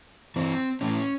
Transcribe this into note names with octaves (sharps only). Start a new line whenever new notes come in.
E3 C4
A2 C#4